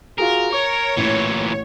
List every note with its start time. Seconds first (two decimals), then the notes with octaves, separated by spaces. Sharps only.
0.18 F4 F#4 G#4 A#4
0.52 C#5 C#6
0.97 A1 A#2 E3